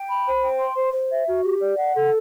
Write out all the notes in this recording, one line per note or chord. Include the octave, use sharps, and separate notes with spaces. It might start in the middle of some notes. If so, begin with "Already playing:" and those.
Already playing: G5
B5
C5
G5
C6
C5
C5
E5
F#4
G4
D5
F#5
A4